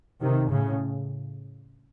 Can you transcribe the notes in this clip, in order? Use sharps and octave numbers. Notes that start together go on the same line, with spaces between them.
C3 D#3
A2 C#3